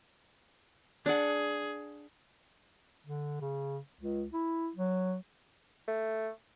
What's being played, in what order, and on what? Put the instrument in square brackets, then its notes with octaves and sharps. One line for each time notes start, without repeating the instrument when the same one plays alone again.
[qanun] D4 F#5 [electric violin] G#4
[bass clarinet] D3
C#3
C#2
E4
F#3
[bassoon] A3